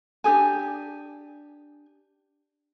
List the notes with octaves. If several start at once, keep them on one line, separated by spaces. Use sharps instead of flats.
D4 G4 G#4 G#5